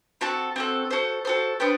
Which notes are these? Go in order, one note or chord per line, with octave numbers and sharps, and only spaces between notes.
C4 F#4 A4
C4 F#4 A4
F#4 A4 C5
F#4 A4 C5
B3 D4 G4 C5